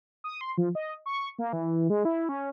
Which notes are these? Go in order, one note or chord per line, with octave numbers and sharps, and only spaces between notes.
D#6
C6
F3
D#5
C#6
A#3
E3
G#3
E4
C#4